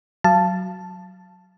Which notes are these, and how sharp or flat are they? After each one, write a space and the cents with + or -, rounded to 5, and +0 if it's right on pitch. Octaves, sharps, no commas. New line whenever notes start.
F#3 +0 F5 -25 A5 +0